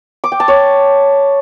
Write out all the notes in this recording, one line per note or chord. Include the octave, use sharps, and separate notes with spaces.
D6
G5
A5
C#5